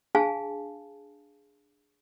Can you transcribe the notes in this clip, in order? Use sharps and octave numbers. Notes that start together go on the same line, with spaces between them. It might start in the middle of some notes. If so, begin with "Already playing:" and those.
D4 G#4 F5 G#5 A5